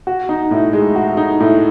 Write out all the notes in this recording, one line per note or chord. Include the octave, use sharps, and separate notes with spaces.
F#4
D#4
A2
G#3
F#4
D#4
A2